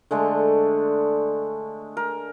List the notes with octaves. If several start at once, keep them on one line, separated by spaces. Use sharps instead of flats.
D3 G#3 A3
A#4